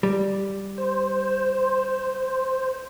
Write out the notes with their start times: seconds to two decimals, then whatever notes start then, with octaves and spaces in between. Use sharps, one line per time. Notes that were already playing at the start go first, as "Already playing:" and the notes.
0.03 G3
0.78 C5